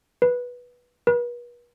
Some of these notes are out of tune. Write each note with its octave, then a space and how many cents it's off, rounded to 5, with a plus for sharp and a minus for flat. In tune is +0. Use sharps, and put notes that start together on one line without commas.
B4 -10
B4 -40